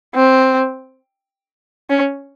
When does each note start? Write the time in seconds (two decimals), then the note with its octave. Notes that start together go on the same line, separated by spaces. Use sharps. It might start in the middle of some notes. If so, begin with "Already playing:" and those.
0.15 C4
1.90 C#4